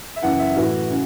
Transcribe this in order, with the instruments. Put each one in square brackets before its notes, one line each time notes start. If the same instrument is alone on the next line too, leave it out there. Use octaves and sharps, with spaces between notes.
[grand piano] E5
F#2 C#3 E3 F#5
E5
A2 E3 F#4
C#3